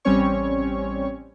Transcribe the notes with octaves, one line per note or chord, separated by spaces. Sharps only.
A1 G3 C4 C#4 C#5 C#6